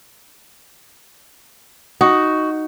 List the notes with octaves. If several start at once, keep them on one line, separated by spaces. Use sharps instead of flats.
D#4 F#4